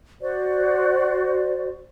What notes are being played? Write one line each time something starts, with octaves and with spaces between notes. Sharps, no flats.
F#4 C5 D5